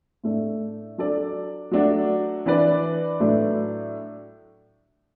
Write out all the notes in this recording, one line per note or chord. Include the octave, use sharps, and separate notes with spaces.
A2 A3 D4
F#3 D4 A4 D5
F#3 A3 D4 F#4 D5
E3 D4 B4 D5
A2 F#3 A3 D4